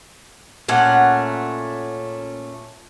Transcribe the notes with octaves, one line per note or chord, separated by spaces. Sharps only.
A#2 A3 C#4 F#5